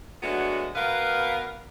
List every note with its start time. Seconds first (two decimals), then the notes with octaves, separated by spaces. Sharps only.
0.23 F#3 G#3 A3 B3 D4 F#4
0.76 B2 B3 A#4 B4 F5